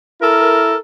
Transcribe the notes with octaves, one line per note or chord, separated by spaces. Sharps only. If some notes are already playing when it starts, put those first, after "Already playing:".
E4 A4 A#4